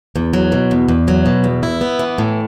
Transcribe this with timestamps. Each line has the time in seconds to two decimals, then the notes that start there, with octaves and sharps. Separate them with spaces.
0.16 E2
0.33 F#3
0.52 B2
0.71 E2
0.88 E2
1.08 F#3
1.26 B2
1.44 E2
1.63 E4
1.81 B3
1.99 E3
2.18 A2